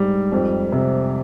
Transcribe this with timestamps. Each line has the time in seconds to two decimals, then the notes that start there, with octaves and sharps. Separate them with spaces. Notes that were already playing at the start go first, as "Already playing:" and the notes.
Already playing: G#2 G3
0.32 F2
0.72 C3